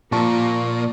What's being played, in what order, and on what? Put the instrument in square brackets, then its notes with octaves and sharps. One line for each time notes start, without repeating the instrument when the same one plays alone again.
[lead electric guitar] A#2 [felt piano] F3 A5 C#6 [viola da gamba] A#3